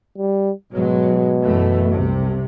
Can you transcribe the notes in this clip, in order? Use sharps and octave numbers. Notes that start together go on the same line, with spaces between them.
G3
G#2 B2 F#3 G#3
F#2 E3 A3
C2 C3